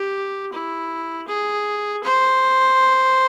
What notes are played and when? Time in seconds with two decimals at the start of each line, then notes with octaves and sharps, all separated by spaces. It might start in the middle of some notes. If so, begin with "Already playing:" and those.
Already playing: G4
0.52 E4
1.28 G#4
2.03 C5